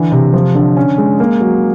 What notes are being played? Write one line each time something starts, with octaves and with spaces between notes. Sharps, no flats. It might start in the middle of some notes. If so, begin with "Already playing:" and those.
Already playing: D3 E3
C3
F3
D3
C#4
G#3
A#3
F#3